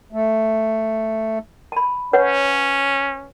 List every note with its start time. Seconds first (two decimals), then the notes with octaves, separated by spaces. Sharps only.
0.13 A3
1.72 A5 B5
2.13 C#4 B4 C#5 F#5